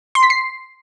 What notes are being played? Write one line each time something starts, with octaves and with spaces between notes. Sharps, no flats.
C6
B6
C7